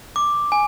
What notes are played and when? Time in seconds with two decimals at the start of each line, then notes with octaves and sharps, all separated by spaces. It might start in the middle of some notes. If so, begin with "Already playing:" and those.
0.16 D6
0.52 G#5